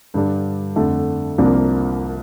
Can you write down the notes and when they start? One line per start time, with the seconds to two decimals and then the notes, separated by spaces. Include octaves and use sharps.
0.14 G2 D3 G3 D4
0.76 F2 D3 A3
1.38 C2 C3 F3 A#3 D4